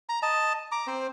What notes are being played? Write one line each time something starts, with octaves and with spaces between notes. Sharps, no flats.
A#5
D#5 A5
A#5 D6
C4 C5